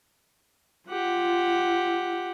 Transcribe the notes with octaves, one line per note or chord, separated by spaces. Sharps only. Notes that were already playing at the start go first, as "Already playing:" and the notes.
F4 G4 F#5